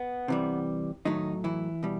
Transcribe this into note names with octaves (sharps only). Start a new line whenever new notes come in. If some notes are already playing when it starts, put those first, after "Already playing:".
Already playing: B3
C3 E3 G3
A2 D#3 F#3 A3 D#4
E3 E4
B2 G3